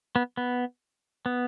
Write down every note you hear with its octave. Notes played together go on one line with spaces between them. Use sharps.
B3
B3
B3